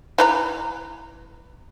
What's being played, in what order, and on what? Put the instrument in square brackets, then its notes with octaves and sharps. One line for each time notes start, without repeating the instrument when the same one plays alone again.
[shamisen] E3 B4 A#5